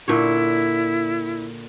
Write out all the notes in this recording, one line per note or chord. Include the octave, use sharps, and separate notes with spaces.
A#2 D3 E4 C#5